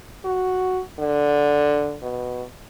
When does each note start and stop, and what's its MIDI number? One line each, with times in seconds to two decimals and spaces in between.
0.25 0.81 66
0.99 1.97 50
2.03 2.43 47